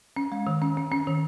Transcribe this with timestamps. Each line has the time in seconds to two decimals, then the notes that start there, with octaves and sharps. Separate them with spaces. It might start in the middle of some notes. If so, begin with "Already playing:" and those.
0.17 C#4
0.32 G#3
0.47 D#3
0.62 C#4
0.77 C#4
0.92 C#4
1.07 D#3